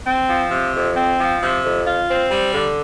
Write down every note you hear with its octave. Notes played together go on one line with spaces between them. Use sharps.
C4
F3
C3
F2
C4
F3
C3
F2
F4
C4
G3
D3